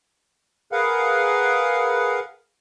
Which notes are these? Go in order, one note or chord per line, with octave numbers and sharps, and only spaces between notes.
G#4 A#4 B4 F5 F#5